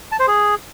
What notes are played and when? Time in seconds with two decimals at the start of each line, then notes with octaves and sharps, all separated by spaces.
0.12 A5
0.20 C5
0.27 G#4